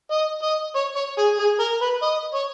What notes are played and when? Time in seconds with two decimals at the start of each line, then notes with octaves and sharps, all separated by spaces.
0.11 D#5
0.43 D#5
0.75 C#5
0.96 C#5
1.18 G#4
1.39 G#4
1.60 A#4
1.82 B4
2.02 D#5
2.34 C#5